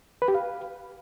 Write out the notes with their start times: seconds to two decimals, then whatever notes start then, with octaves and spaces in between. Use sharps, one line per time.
0.22 B4
0.28 G4
0.35 F5